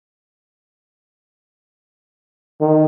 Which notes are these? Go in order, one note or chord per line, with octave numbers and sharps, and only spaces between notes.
D#3